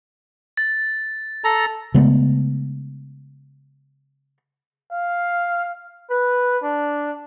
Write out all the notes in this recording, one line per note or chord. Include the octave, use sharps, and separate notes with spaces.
A6
A4 A#5
C#3 G#3 A3 B3
F5
B4
D4